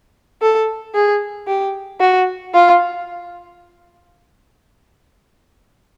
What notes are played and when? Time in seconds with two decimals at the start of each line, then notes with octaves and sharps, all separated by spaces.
0.42 A4
0.94 G#4
1.47 G4
2.00 F#4
2.54 F4